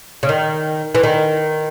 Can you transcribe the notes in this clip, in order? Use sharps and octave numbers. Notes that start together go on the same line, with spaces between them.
C#3
D#3
E3
D#3